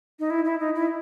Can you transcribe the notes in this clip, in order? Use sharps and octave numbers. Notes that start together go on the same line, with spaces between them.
D#4
E4
E4
D#4
E4